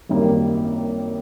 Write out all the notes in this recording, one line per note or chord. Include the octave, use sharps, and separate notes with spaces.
G#1 F#2 D#3 G3 A#3